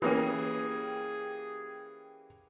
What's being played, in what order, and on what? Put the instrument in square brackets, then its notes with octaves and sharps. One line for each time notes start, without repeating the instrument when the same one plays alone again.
[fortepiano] E3 A#3 C#4 [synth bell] G4 G5 [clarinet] G#4